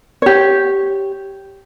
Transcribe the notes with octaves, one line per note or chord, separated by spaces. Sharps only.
G4 C#5